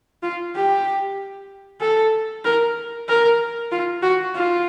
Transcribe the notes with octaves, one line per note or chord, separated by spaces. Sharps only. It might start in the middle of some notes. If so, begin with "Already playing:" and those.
F4
G4
A4
A#4
A#4
F4
F#4
F4